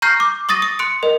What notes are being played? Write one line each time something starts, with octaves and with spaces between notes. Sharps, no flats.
A#5 C#6 F6 G6 A#6 C7
D6
C#6 D#6 A6 A#6 D#7
D#6
C6 F#6 C#7 D7
A#4 D#5